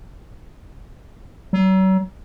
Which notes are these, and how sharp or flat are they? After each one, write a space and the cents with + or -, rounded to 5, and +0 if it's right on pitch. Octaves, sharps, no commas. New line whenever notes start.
F#3 +40